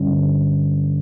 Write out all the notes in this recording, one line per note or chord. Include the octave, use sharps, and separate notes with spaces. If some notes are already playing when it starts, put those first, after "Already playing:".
Already playing: G2 D3 G3 C#4